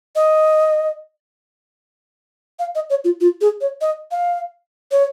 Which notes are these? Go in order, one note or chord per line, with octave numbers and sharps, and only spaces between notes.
D#5
F5
D#5
C#5
F4
F4
G#4
C#5
D#5
F5
C#5